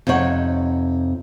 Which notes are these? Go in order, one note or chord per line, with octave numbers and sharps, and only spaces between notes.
F2 C3 D#4 C#5 F#5